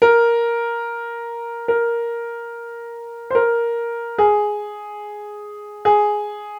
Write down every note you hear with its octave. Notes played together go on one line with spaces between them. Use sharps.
A#4
A#4
C5
A#4
G#4
G#4